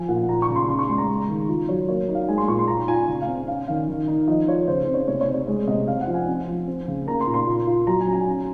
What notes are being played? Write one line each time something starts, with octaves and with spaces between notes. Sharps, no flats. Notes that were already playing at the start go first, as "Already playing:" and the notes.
Already playing: F3 G#5
A#2 F#5
F4 A#5
C#6
C#3
C6
C#3 C6
C#6
G#3 C6
A#5
G#3
D#3
F4
F#3 C#5
A#3 C#5
D#4
F5
G#3 G#5
C6
A#2 C#6
C6
F4 A#5
F4 G#5
C#3
F5
C4
C#4 F5
D#3 F5
D#3
D#4
F3 D#5
F4 C#5
C#3 C5
C4 C5
C#5
C3 C#5
C#5
C4
C#5
G#3 C#5
C3 D#5
C4 F5
F#5
F3
G#5
C4
F3
C4
C#3
A#3 A#5
C6
A#2
C6
F4
F4
F#3 A#5
G#5
C#4
G#5
C#4